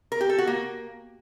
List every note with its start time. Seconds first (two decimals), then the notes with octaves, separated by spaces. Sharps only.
0.12 A#4
0.21 G4
0.30 A4
0.38 F#4
0.47 A#3